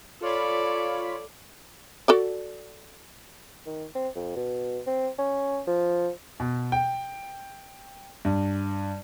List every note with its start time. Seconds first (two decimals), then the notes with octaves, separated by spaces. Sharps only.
0.21 F4 A4 C#5 D5 B5
2.08 F#4 A4 D5
3.66 D#3
3.95 C4
4.15 F2
4.36 B2
4.87 C4
5.19 C#4
5.67 F3
6.40 B2
6.72 G5
8.25 G2